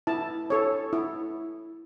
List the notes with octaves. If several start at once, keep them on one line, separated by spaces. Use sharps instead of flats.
E4 A5
A4 C#5
E4